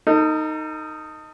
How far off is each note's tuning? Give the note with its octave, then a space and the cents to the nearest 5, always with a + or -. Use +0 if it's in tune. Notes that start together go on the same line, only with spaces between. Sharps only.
D#4 +0 A4 +45